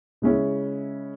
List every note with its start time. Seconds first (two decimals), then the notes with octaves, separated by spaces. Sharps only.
0.22 C#3 G#3 C#4 E4